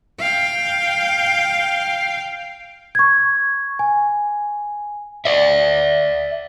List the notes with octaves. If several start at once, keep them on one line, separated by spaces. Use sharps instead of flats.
F5 G5
C#6 G#6
G#5
D5 E5